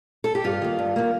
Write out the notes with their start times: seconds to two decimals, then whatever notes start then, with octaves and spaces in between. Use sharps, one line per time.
0.24 A4
0.35 G4
0.44 G2 F4
0.62 D#3 A#3
0.79 G2
0.96 D#3 A#3